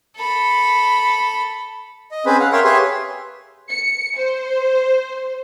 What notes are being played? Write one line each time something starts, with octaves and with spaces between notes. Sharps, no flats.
A4 B5
D#5
C4 C#4 G#4 B4 C5 B5
F5 F#5
A#4 C#5 E5 F5 G5 C6
G4 G#4 B4 C#5 E5 C6
C#7
C5